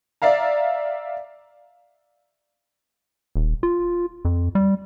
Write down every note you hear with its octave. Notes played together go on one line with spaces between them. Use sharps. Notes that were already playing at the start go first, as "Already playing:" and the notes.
D5 E5 F5 A#5
D#1
F4
F2
G3